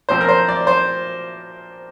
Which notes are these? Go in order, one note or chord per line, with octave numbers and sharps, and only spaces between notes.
A#2 F3 C4 C5
A#4
C5
D5
C5